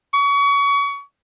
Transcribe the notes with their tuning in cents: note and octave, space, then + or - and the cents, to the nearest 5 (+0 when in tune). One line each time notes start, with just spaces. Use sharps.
C#6 +30